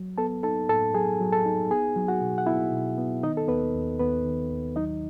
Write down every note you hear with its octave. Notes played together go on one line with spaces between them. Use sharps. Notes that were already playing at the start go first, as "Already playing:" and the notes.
Already playing: F#3
B3 A4 A5
D#4 A4 A5
A2 A4 A5
F#3 G#4 G#5
F#3
A4 A5
D#4
B3 G#4 G#5
F#3
F#4 F#5
B2
F#5
B3 E4 E5
B2
B3
D#3 D#4 D#5
A4
D#2 B3 B4
D#2
D#2 B3 B4
D#3
D#2
F#3 D#4 D#5